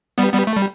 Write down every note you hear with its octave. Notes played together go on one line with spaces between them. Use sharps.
G3 B3
G3 B3
A3
G3